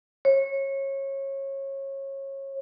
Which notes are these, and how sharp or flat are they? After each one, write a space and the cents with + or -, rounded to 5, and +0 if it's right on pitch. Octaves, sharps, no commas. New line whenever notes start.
C#5 -25